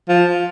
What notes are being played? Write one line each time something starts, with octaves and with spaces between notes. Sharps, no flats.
F3